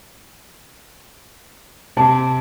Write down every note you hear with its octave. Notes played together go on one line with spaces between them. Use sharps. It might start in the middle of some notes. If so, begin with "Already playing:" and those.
C3 A5